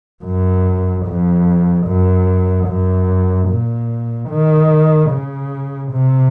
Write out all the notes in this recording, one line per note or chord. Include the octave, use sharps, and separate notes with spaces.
F#2
F2
F#2
F#2
A#2
D#3
C#3
C3